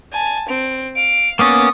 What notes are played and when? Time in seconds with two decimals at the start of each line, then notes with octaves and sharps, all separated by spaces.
0.12 G#5 A5
0.48 C4 D7
0.96 F5 D7
1.39 A#3 B3 C#4 C#6 D#6 A6